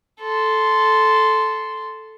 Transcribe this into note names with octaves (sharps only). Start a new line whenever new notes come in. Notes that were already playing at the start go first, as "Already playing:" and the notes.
A4 C6